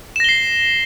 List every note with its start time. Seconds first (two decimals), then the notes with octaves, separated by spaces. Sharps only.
0.16 E7
0.20 A#6
0.24 G7
0.29 C7